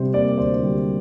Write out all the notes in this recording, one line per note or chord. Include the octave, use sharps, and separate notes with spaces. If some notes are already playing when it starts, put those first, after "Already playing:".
Already playing: C3 G3 C5
A#3 D5
D2 C5
G3